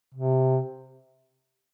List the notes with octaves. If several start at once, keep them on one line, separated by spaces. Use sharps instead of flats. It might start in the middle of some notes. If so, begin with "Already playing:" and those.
C3